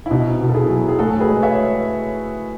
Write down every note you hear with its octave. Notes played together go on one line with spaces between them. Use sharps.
E4
B2 D#4
B2
A4
E4 G#4
F#3
G#4
A2 F#4 A4
A4
G#4 B4
G#3
C#5 E5